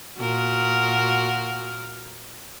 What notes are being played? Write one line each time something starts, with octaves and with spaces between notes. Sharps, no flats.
A#2 F#4 A#4